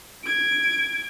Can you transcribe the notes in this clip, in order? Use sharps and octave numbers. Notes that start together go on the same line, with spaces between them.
G#6 D7